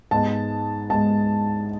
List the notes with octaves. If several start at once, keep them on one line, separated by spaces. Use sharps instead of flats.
G#2 G#3 B3 A5
G#2 G#3 B3 A5